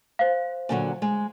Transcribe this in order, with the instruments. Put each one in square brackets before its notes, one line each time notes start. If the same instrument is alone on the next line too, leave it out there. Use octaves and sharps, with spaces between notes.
[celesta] C5 F5
[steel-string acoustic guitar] A#2 D3 F#3
G#3